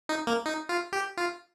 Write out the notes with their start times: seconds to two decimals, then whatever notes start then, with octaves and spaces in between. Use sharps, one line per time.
0.09 D#4
0.27 A#3
0.46 D#4
0.69 F4
0.93 G4
1.17 F4